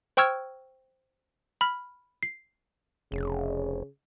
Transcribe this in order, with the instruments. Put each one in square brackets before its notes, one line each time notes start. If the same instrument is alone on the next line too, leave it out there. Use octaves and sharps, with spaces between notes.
[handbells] C5 G5 C#6 E6 F6 G#6
B5 F6
C7
[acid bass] F1 [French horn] C#3